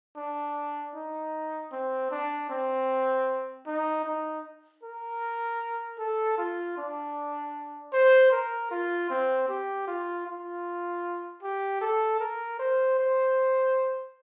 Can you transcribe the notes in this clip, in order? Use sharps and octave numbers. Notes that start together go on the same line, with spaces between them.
D4
D#4
C4
D4
C4
D#4
D#4
A#4
A4
F4
D4
C5
A#4
F4
C4
G4
F4
F4
G4
A4
A#4
C5
C5